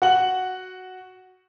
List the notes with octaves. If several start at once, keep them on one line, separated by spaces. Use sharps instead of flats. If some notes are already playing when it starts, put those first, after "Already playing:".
F#4 F#5 F#7